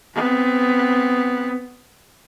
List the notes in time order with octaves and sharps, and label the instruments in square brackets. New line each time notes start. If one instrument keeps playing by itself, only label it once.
[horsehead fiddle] B3 C4